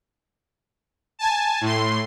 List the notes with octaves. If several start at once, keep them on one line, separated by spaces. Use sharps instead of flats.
G#5 A5
A2 C6